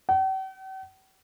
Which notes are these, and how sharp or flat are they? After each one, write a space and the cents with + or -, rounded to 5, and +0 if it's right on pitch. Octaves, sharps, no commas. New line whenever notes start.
G5 -45